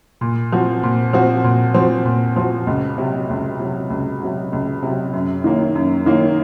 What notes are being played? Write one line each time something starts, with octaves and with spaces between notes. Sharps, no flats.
A#2
F3 C4 F#4
A#2
F3 C4 F#4
A#2
F3 C4 F#4
A#2
F3 C4 F#4
C#2
C3 F#3
C#2
C3 F#3
C#2
C3 F#3
C#2
C3 F#3
F#2
D#3 A#3 C#4
F#2
D#3 A#3 C#4